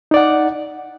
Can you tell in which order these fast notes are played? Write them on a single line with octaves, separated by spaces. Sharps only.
D#4 D5 F#5